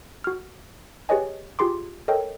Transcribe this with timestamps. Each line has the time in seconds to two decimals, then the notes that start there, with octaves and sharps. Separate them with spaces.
0.24 F#4 F6
1.09 G4 G#4 B4 C#5 D#5 G#5
1.59 F4 G4 G#4 C6 D6
2.08 A4 A#4 C#5 D#5 G5